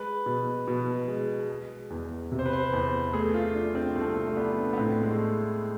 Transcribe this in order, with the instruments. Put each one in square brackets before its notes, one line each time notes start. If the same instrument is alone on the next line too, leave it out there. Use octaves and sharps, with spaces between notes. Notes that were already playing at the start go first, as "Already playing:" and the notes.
Already playing: [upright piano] G#3 [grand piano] B4
[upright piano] B2
B2
G#3
G#3
E2
C3
[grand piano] C5
B4
C5
[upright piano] E2 [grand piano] B4
[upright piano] A3 [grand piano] G#4
[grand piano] F4
[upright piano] D4
[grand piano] C4
[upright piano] C2 [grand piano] A3
[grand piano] A3
[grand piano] B3 [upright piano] D4
[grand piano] B3
[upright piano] A2 [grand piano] C4
[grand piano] G#3
A3